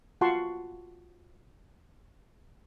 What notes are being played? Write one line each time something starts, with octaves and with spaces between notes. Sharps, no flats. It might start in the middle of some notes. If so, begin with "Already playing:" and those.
F4 F#4 F#5 A5 C6 C#6